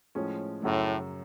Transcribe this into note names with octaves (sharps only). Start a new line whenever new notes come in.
A2 F3 G#3 C#4
F#2 A2 C#3 F#3